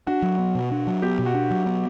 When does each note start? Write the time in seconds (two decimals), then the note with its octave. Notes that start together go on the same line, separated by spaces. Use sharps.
0.07 D4 F#4
0.22 F#3
0.39 B3
0.55 B2
0.71 D4
0.87 F#3
1.02 B3 G4
1.19 B2
1.26 F#4
1.34 D4
1.51 F#3
1.66 B3